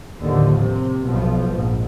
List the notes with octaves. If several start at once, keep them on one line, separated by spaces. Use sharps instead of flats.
D#2 A2 D3 F3
C3
B1 B2 F3
A#1 G#2